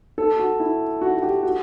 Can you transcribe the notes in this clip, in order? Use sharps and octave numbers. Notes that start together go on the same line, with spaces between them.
A4
F#4
E4
F#4
F#4
G4
F#4